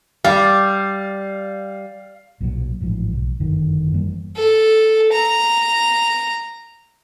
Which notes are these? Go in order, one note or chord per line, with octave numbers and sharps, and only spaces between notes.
G3 F5
B1 A#2 D3 F#3
A1 G#2 F3
B1
G1 F#2 D3 D#3
F#2 E3 G3 A#3
A4
A#5